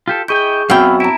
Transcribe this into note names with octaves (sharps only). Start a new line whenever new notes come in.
F4 G4 A4
E4 G#4 D#5 G5 C#6 G6
F#2 B3 C4 F5 G5 B5 E6 F6
E4 A5 A#5 D7